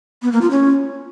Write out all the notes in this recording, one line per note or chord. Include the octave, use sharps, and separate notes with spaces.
B3
A#3
F4
C#4